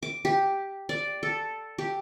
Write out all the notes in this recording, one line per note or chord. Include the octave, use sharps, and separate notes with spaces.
D6
G4
D5
A4
G4